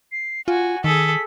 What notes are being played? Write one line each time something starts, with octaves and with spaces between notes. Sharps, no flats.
C7
F4 F#4 G#5
D#3 G#4 A4 B6